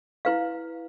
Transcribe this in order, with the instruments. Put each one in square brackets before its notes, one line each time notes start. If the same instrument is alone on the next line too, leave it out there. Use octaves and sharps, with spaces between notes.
[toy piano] E4 B4 F5